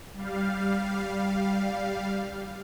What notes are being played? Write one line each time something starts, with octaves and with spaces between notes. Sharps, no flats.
G3 F5